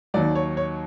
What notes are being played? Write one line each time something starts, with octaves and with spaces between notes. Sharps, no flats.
D#2 D#3 F#3 D5
C#5
C#5